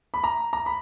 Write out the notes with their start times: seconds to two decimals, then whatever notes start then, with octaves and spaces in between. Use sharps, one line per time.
0.14 B5
0.24 A#5
0.53 A#5
0.66 B5